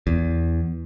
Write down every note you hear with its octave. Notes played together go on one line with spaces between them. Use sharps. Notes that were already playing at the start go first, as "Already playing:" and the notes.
E2